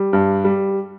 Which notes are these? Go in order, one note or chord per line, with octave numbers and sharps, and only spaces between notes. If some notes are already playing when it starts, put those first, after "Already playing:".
Already playing: G3
G2
G3